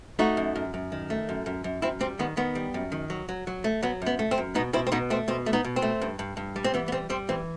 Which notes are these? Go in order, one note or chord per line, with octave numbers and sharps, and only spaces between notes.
A3 D#4 F#4
F#2
F#2
F#2
D#3
A3
F#2
F#2
F#2
F#2 C4 E4
G3 C4
D#3 B3
D#3 B3
G3
F#2
D#3
F#3
F#3
F#3
A3
F#3 B3
F#2 B3
A3
C4
F#2
B2 B3 D#4
B2 C4 E4
C4
B2 B3 D#4
A3 C4
B2 C4
A3
B3 D#4
B2
C4
A3
G2
G2
G2
G3
C4
E3 B3
B3
G3 C4
G3 C4
E3 C4